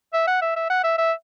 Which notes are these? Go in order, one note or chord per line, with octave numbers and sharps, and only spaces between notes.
E5
F#5
E5
E5
F#5
E5
E5